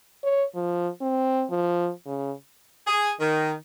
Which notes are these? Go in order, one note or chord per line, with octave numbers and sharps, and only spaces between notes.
C#5
F3
C4
F3
C#3
G#4
D#3